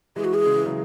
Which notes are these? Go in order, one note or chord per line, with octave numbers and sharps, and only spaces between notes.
E3 G#3 G#4
F#4
G#4
C#3
E3
C#3 F#3